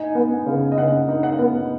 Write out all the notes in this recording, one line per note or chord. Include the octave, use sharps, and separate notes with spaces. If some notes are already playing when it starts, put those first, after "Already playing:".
Already playing: D#4 G#5
B3
C#3
D#5
C#3 F#5
D#4
F#5
B3